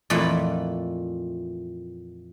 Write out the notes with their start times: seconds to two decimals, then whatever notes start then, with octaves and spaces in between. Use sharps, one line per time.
0.10 F2 A#2 E3 A3 F4 B5